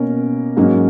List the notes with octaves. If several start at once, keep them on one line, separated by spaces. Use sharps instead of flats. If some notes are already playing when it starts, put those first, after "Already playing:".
Already playing: B2 A#3 C#4 A#4
G#2 F#3 A#3 C#4